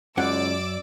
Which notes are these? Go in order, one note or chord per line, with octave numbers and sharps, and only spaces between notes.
C#2 F#2 C#4 D5 F#5 D6 E6